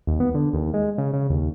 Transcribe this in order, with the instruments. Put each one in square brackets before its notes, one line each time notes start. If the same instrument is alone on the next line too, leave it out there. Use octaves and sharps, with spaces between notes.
[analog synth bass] D#2
B3
D3
D#2
G#3
C#3
C#3
D#2